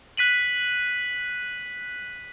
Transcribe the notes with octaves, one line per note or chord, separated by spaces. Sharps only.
F#6 B6 D#7 F#7